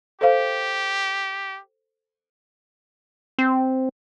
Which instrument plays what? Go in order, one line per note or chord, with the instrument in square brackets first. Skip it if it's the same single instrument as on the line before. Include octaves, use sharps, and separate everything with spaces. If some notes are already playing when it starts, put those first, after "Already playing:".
[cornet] G4 [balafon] A4 C5 F5
[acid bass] C4